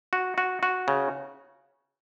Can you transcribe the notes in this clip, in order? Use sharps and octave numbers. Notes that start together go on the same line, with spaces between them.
F#4
F#4
F#4
C#3